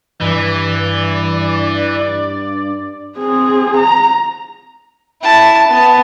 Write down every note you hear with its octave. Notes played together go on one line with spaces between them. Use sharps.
G2 E3 D5
C4 G#4
A#5
E4 A5
B3 A5